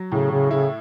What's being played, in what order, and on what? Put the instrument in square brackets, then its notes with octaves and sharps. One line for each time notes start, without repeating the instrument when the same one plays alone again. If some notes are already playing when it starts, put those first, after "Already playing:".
Already playing: [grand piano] F#3
[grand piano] A2 [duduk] C#3
[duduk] C#3
[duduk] C#3 [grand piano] E4